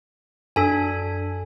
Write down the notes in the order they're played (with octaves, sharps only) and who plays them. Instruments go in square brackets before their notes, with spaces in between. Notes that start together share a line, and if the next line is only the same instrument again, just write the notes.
[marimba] F#2 [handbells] D4 A4 G#5